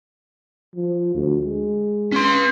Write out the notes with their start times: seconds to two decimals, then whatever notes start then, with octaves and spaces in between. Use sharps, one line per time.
0.76 F3
1.15 D2
1.45 G#3
2.12 C#4 C6